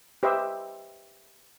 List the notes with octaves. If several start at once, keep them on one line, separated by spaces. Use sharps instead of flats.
G4 B4 C5 D#5 E5